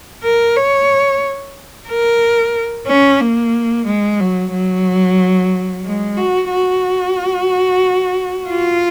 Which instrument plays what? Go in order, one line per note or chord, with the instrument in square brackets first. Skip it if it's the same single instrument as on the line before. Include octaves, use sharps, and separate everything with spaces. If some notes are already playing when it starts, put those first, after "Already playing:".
[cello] A#4
C#5
A#4
C#4
A#3
G#3
F#3
F#3
G#3
F#4
F#4
F4